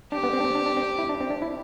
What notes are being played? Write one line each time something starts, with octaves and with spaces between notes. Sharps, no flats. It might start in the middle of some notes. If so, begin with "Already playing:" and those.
D4 G4
B3
C4
D4
C4
D4
D4
C4
E4
D4
C4
D4
E4